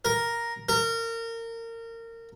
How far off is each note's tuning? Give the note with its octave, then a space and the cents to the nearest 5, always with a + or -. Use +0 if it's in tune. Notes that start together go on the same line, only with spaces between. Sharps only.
A#4 +5
A#4 -25